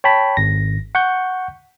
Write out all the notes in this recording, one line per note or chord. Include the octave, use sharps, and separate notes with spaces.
C#5 G5 A5 B5
G#1 A#6
F#5 C#6 G6